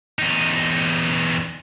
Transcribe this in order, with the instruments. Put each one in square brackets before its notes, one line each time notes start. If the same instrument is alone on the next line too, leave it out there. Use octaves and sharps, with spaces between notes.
[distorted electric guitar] E2 D#4